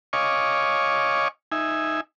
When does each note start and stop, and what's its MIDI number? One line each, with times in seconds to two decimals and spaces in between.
0.13 1.28 73
0.13 1.28 75
0.13 1.28 77
0.13 1.28 80
0.13 1.28 85
0.13 1.28 86
1.52 2.01 63
1.52 2.01 76
1.52 2.01 80